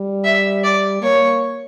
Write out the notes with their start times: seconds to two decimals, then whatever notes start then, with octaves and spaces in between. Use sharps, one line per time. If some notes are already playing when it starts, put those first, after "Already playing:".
Already playing: G3
0.24 E5
0.64 D5
1.02 A#3 C#5